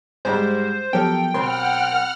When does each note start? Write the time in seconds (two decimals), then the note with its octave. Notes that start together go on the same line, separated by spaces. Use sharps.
0.25 G#2 G3 G#3 C5
0.93 F3 F#3 B3 G4 A4 A#4 G5
1.34 B1 C4 A#4 F#5 C6 F6